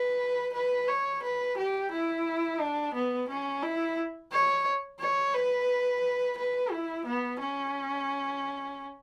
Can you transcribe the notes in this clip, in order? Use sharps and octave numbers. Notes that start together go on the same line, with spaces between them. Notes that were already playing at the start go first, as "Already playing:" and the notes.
Already playing: B4
B4
C#5
B4
G4
E4
D4
B3
C#4
E4
C#5
C#5
B4
B4
E4
B3
C#4